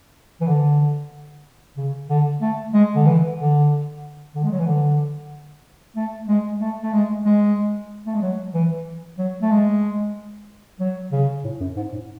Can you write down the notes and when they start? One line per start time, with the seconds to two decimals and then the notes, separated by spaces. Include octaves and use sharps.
0.41 E3
0.48 D3
1.77 C#3
2.09 D3
2.41 A3
2.73 G#3
2.95 D3
3.06 E3
3.38 D3
4.35 D3
4.44 G#3
4.51 F#3
4.59 E3
4.67 D3
5.96 A3
6.28 G#3
6.61 A3
6.83 A3
6.93 G#3
7.25 G#3
8.06 A3
8.14 G#3
8.22 F#3
8.54 E3
9.18 F#3
9.42 A3
9.51 G#3
10.80 F#3
11.12 C#3
11.44 A2
11.60 F#2
11.76 G#2
11.92 A2